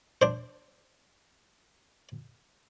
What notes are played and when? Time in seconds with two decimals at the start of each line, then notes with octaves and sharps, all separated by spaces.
0.22 D4 C5